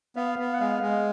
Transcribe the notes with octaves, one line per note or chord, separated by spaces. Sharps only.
B3 F5
B3
F#5
G#3 F5
G#3